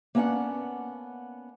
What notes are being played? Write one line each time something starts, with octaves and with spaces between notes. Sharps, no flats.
A#3 B3 C#4 D4 F#5